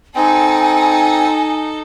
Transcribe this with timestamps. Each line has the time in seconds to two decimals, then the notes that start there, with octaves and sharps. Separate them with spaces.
0.15 C4 D#4 A4 G#5